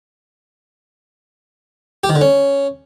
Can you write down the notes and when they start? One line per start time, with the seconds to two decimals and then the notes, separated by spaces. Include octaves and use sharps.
2.04 G4
2.09 D#3
2.15 D3
2.21 C#4